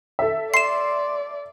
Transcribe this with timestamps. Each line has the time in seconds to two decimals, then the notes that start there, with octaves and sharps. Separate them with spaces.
0.19 A4 E5
0.54 D5 C6 C7 E7